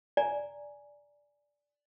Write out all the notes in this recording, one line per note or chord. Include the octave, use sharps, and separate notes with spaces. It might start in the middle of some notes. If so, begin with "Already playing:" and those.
D5 G#5 A#5